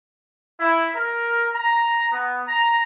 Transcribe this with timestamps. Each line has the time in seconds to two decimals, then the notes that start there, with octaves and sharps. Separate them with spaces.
0.60 E4
0.95 A#4
1.55 A#5
2.12 B3
2.48 A#5